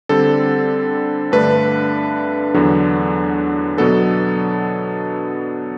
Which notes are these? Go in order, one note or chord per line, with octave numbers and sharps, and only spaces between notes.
D3 G3 C4 A4
G2 D3 A3 D4 B4
E2 D3 F#3 B3 D4
B2 F#3 B3 D4 A4